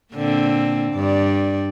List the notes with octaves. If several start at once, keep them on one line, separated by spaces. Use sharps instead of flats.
A#2 D3 C4
G2 D5